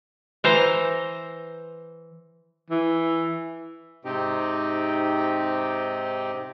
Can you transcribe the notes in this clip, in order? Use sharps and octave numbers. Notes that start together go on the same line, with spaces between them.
E3 C5 A#5
E3
G#2 C3 C4 D#4 G4